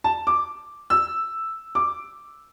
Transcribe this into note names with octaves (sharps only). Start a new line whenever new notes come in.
A5
D6
E6
D6